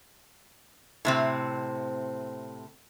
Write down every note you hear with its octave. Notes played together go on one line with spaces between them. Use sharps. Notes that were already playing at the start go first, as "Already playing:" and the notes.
A2 C3 C4